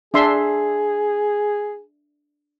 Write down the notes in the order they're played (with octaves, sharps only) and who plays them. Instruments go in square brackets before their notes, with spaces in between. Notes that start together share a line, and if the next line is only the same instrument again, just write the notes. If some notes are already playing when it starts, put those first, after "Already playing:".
[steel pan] D4 E5 C6 [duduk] G#4